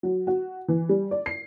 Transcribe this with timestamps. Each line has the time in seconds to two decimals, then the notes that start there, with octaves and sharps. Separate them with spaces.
0.03 F#3
0.27 F#4
0.68 E3
0.89 G3
1.11 D5
1.26 C7